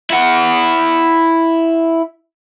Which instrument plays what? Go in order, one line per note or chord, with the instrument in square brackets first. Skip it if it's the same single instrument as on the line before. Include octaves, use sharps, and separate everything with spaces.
[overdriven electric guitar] E4 F#5